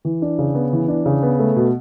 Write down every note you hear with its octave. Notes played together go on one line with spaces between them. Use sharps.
E3
D4
C#3
B3
E3
D4
C#3
B3
A3
B2